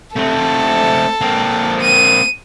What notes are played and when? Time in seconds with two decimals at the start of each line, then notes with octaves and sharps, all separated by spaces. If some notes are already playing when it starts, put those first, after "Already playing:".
0.16 A3 C4 A4
1.21 A#3 C4
1.82 D#7